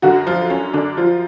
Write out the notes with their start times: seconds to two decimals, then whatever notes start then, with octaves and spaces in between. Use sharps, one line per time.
0.02 F#2 D3 F#3 F#4
0.27 F3 F4
0.50 C#4
0.74 D3 D4
0.97 F3 F4